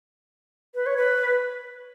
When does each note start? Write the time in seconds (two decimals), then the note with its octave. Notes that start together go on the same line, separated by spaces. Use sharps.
0.75 B4
0.86 C#5
0.97 B4